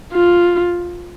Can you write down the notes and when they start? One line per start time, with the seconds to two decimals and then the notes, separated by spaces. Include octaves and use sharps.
0.13 F4